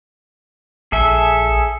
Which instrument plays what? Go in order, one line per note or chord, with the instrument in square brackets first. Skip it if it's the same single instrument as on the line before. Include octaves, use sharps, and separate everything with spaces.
[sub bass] A#1 [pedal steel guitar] G#4 A4 E5